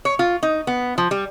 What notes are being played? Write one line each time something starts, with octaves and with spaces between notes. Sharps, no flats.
C#5
F4
D#4
B3
F3
G3